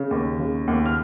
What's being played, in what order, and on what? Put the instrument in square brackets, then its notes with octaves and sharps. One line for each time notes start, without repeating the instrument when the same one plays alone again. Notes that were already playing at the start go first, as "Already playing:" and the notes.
Already playing: [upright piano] C#3
D#2
C#3
D#2
F6